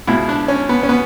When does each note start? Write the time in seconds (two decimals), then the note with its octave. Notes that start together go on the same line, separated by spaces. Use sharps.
0.07 C#2 B2 E4
0.29 D4
0.48 C#4
0.69 B3
0.83 C#4
0.89 B3